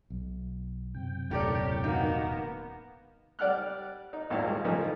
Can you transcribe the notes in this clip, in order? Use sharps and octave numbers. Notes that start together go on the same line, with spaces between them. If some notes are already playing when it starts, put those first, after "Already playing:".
B1
F#2 C3 G5
D#1 A2 G4 A#4 C#5 D5
G#2 A#3 B3 D#4 F#4
G3 D5 F#5 F6 F#6
D#4
G#1 E2 A#2 E4 F5
G3 G#3
C#3 E3 F3 G3 A3 D#4